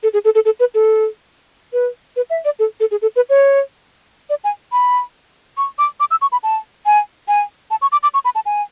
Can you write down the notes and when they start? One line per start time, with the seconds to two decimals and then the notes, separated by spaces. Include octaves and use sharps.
0.03 A4
0.13 G#4
0.25 A4
0.35 A4
0.45 A4
0.60 B4
0.74 A4
1.73 B4
2.16 B4
2.30 E5
2.45 D5
2.59 A4
2.80 A4
2.91 G#4
3.02 A4
3.16 B4
3.29 C#5
4.30 D5
4.44 G#5
4.72 B5
5.57 C#6
5.79 D6
6.00 D6
6.11 E6
6.22 C#6
6.32 B5
6.43 A5
6.86 G#5
7.28 G#5
7.71 A5
7.82 C#6
7.92 D6
8.03 D6
8.14 C#6
8.25 B5
8.35 A5
8.46 G#5